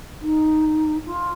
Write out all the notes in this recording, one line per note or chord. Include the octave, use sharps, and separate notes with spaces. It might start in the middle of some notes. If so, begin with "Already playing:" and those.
D#4
F4